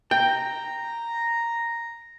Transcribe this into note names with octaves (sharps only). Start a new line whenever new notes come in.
G5 A#5